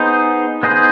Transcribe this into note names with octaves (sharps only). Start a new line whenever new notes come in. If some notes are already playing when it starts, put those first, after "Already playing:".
Already playing: B3 D#4 G#4 C5
B3 D#4 G#4 C5